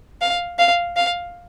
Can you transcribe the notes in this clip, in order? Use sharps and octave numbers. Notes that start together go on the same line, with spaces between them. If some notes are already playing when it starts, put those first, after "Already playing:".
F5
F5
F5